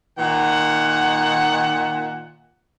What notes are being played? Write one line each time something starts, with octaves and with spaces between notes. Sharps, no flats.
A#2 D#3 F#5